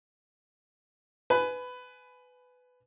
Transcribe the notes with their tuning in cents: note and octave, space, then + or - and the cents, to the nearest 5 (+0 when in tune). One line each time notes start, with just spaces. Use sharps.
B4 +15 G#5 +25 B5 +10